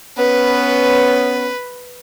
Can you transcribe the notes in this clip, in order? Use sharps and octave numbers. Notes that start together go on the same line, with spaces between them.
B3 C#4 B4